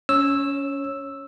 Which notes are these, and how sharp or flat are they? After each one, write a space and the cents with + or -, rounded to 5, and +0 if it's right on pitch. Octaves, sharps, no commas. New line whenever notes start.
C#4 +20 C#5 -20 E6 +0